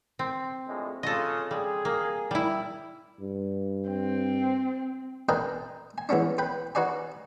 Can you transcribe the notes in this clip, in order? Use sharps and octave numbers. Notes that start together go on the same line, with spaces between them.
C4
A#1 A2 G#3
C#3 F4 A4 D#5
G3 G#4
A#3
G3 E4
G2
C4
D4 A#4 B4 D#5 G5 G#5
G#5
E3 G#3 B3 C#4 D4
B4 G5 B5
D#4 F#4 B4 D5 G#5